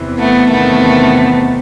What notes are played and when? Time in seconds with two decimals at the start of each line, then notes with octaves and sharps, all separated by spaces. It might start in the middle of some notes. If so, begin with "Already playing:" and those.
Already playing: E2 C3 E3
0.19 A3 B3
0.50 E2 C3 D#3 A3 B3